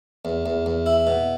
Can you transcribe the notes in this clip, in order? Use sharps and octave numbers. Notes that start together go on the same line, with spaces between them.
E2
E2
E2
E4
B2